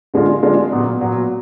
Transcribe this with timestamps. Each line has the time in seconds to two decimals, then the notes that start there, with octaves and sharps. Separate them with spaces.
0.14 D3 G#3 D4 F4
0.42 D3 G#3 D4 F4
0.72 A#2 F#3 B3
1.00 A#2 F#3 B3